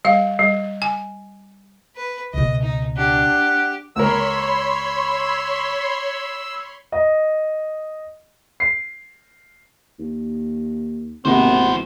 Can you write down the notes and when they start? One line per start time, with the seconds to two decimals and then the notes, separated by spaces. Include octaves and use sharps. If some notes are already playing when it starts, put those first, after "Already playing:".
0.05 G3 F5
0.39 G3
0.82 G#5
1.96 B4
2.34 C#2 B2 D#5
2.62 D#4
2.97 D4 G4 F#5
3.96 C#2 A#4 C#5 B5 C6 E6
6.92 D#5
8.60 C7
10.00 D#2
11.25 G#1 D#2 C3 D#3 E3 B3 C5